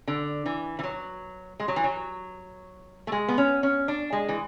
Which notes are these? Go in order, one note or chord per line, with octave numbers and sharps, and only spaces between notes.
D3
E3
E3
F#3
G#3
F#3
E3
F#3
A3
G#3
B3
C#4
C#4
D4
G#3
E3